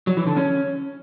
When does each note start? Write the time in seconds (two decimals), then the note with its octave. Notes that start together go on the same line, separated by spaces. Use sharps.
0.07 F#3
0.17 E3
0.27 D3
0.37 C#4